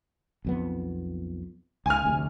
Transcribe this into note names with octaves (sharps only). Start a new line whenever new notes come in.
B1 F2 B3
C#2 G#5 F6
F1 D2 C3